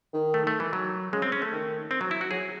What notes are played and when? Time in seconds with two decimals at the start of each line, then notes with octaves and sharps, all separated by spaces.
0.13 D#3
0.34 A3
0.47 A3
0.60 E3
0.73 F#3
1.12 C#3 G#3
1.22 C4
1.32 C#4
1.42 A3
1.52 D#3
1.91 C4
2.01 F#3
2.11 E4
2.21 F#4
2.30 F#3 G#4